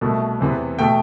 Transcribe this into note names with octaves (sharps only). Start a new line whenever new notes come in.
C2 B2 A3
E2 C3 E3 B3
B2 A3 G5